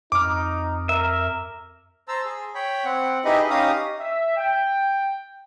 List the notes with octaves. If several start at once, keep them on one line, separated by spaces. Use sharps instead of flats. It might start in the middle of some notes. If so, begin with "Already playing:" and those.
F2 D#4 D6 F6
A#4 E5
C5 A5 A#5 E6
G#4
C#5 G5 B5
C4 F#5
D#4 E4 G4 G#4 B4 D#5
C#4 D#4 G4 F5 A#5 D#6
E5
G5